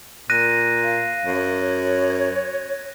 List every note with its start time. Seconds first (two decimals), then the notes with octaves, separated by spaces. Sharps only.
0.30 A#2 F#6 A#6 D#7
0.83 F5
1.25 F#2
1.61 C#5